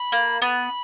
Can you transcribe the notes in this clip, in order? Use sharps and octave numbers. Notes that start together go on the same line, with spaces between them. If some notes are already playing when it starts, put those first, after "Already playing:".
Already playing: B5
A#3
B3 B5